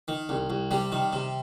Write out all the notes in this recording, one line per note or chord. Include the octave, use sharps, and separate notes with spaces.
D#3
C2
C2
C3 G3
D#3
C3